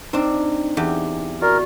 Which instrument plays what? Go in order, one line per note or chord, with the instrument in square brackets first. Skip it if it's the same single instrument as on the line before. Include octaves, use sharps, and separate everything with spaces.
[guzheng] C4 D4 [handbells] D#4
[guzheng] E2 G4
[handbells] F#4 D5 [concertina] A#4